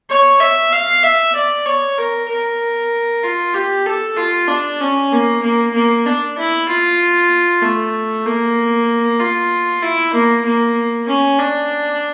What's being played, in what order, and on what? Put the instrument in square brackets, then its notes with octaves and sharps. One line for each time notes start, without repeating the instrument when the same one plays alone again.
[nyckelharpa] C#5
E5
F5
E5
D5
C#5
A#4
A#4
F4
G4
A4
F4
D4
C#4
A#3
A#3
A#3
D4
E4
F4
A3
A#3
F4
E4
A#3
A#3
C#4
D4